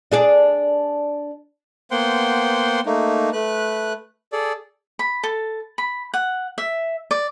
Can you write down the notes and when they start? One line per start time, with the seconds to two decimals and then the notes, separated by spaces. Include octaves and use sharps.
0.12 D4 G#4 D5
1.91 A#3 B3 C5 F#5 G5 C6
2.86 A3 A#3 D#4
3.33 A3 B4 F#6
4.32 G#4 A4 D5
4.99 B5
5.23 A4
5.78 B5
6.14 F#5
6.58 E5
7.11 D5